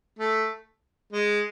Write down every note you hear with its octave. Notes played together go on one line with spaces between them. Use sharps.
A3
G#3